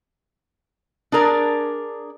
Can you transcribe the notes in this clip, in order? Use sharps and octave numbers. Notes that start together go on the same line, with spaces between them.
D4 G#4 A#4 D5